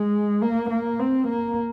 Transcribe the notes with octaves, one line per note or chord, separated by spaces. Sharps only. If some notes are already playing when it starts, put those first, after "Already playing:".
Already playing: G#3
A#3
A#3
C4
A#3